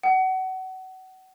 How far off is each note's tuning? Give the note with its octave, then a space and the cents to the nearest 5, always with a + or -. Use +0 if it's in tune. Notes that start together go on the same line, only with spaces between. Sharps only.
F#5 +30